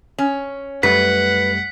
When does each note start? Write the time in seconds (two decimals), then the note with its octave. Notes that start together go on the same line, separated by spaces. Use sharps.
0.19 C#4
0.83 F#2 G3 A3 B4 F#5 B6